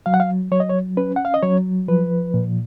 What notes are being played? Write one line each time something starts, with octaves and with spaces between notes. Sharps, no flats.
F#3 F5
F#5
F5
F#3 C#5
D#5
C#5
C#4 B4
F#5
F5
D#5
F#3 C#5
F3 B4
A#2